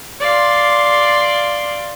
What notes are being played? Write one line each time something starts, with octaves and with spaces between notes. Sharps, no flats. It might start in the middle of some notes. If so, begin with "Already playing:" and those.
D5 F5 C6